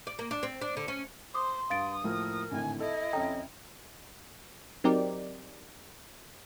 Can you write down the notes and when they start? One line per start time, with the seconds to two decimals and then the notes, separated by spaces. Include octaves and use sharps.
0.07 D5
0.19 A#3
0.31 D4
0.43 C4
0.61 D4
0.77 D3
0.88 C#4
1.34 C5 C6 D6 D#6
1.70 G2 F5 D#6 A6 D7
2.04 A2 F3 A#3 A#4
2.51 G#1 A2 D3 G#5
2.80 E4 A4 D#5
3.13 F2 C#4 A4 G5 A#5 D#6
4.84 F#3 C4 D#4 G4 A#4 D5